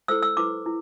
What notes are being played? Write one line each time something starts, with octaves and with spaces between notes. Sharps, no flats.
E4 A4 C5 E6
E6
E4 B4 D6
E4